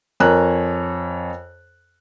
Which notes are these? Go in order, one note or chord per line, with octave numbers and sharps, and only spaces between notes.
F2 A#4 C#5 G#5 F#6